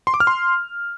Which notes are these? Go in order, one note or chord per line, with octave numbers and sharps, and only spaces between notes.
C6
D6
F6
C6